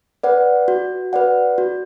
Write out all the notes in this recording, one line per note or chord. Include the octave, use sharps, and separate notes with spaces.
B4 D5 F#5
F#4
B4 D5 F#5
F#4